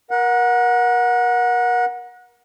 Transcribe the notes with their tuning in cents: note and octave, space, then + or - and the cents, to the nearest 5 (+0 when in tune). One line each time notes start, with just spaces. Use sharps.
A#4 +30 F#5 -20